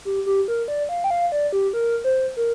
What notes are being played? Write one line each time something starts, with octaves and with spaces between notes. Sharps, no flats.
G4
G4
A#4
D5
F5
G5
F5
D5
G4
A#4
C5
A#4